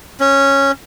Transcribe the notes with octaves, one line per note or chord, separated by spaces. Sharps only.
C#4